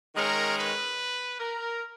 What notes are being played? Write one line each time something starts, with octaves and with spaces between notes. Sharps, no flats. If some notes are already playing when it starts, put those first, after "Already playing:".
D#3 G#3 C#4 A#4
B4
A#4